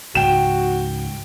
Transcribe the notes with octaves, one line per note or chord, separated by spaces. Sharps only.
C#2 G#2 F#4 G5 E7